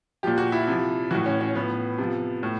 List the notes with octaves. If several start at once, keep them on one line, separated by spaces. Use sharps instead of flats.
A#2 F3 G4
F#4
E4
C3 F3
A2 E3 F#4
C#4
C#4
A2 F3 B3
C3 F3
A2